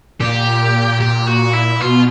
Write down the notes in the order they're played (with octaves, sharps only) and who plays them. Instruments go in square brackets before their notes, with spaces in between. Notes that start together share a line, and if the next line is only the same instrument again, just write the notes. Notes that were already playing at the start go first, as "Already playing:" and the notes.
[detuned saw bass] A#2 [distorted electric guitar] G4
[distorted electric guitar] G4
F#4
E4
[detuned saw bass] B2 [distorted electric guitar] F4